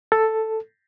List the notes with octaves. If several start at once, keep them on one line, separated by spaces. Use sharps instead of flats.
A4